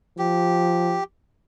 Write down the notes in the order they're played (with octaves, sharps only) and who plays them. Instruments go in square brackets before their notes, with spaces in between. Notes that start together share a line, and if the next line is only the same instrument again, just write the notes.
[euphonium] F3 [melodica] G4